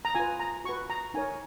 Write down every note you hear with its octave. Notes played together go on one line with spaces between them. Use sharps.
A#5
F4 B4 G#5
A#5
F#4 B4 C#6
A#5
D#4 A#4 C#5 G#5